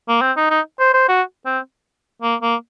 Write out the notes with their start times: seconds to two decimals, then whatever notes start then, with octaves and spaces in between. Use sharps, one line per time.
0.09 A#3
0.22 C4
0.37 D#4
0.50 D#4
0.80 C5
0.94 C5
1.09 F#4
1.46 C4
2.22 A#3
2.42 A#3